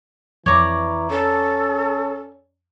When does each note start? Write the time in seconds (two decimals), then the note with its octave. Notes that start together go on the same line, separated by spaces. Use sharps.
0.46 F2 E3 C#5 D5 A#5
1.10 C#4 A4